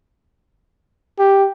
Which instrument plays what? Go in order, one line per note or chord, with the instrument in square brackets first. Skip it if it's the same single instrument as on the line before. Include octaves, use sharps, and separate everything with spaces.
[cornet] G4